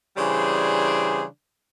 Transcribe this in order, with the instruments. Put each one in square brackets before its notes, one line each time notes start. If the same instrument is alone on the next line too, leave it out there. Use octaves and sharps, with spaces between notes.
[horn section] C#3 E3 G3 D4 G#4 C5